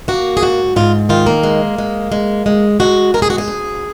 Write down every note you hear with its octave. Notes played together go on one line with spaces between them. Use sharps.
A#3 F#4
G#4
G#2 F#4
G#2 F4
D#3 F4
A#3
G#3
G#3
G#3
G#3
G#3 F#4
G#3 A#4
G#4
F#4
G#4
D2